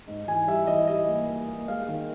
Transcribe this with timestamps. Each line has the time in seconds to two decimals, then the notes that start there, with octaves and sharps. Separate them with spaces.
0.08 G#2
0.28 E3 G#5
0.48 G3 E5
0.67 E3 D#5
0.87 G3 D#5
1.08 A#3
1.28 A#3
1.48 A#3
1.68 G#3 F5
1.88 D#3